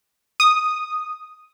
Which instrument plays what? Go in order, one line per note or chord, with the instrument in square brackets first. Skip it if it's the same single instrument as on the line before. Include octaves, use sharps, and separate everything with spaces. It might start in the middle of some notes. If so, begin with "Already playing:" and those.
[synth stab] D#6